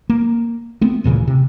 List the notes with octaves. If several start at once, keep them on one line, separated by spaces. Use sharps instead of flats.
A#3
A3 B3 C4
D#1 A#2 C#3 E3
C3